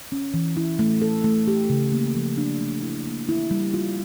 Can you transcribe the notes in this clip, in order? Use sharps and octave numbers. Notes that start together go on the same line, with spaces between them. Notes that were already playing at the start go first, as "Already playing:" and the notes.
C#4
E3
E4
A3
A4
A3
G4
C#3
A#3
F3
D4
A3
E4
A#3
E4
G3
F4